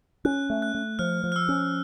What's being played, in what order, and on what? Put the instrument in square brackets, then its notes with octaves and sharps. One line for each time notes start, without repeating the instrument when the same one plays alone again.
[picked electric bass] C#4 [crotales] F#6
[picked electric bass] A3
[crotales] F#6
[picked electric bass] A3
[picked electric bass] F3 [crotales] F6
[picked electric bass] F3
[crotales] F6
E6
[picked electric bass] C#4